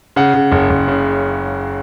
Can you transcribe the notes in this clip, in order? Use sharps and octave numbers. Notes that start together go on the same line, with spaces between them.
C#3 F#5
C#3
F#1
F#1
C#3